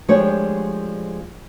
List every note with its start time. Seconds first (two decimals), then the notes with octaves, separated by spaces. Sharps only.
0.09 F3 G#3 A3 D4 G4 C#5